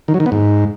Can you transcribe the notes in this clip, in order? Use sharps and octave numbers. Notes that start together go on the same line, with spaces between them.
D#3
F#3
D#3
B3
G#2